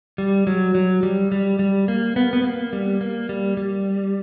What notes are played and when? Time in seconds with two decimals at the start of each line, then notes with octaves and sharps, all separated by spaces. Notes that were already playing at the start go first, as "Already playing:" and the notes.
0.18 G3
0.47 F#3
0.75 F#3
1.03 G3
1.32 G3
1.59 G3
1.88 A#3
2.16 B3
2.33 B3
2.44 A#3
2.73 G3
3.01 A#3
3.29 G3
3.57 G3